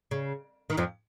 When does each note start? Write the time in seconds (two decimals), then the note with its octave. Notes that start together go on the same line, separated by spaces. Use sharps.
0.11 C#3
0.70 D#3
0.77 F2 F3